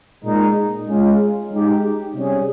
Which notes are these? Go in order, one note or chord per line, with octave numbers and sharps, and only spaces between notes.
A#2 G#3 D#4
G#3 C#4 F4
G#3 D#4 G4
C3 G3 C#4 G#4